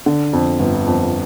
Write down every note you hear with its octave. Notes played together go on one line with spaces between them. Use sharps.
D3
F2
G1
F2